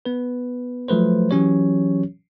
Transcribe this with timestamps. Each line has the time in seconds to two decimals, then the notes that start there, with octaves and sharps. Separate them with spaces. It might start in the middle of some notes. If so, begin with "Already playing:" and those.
0.05 B3 B4
0.88 F3 F#3 A3 B4 C5
1.31 E3 F#3 C#4 G4 C#5